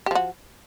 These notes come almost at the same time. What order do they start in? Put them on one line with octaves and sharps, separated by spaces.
G4 F3 F#4